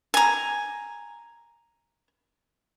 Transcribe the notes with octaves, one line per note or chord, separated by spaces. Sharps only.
G#5 A#5